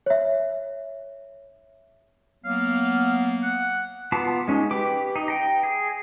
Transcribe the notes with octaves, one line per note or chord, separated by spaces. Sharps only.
C#5 E5
F#3 A#3 B3 F5
F#5
B3 F4 A5 A#5 D6
G#3 C#4 D#4
G4 B4 D6
D#4
G5 A#5
G#4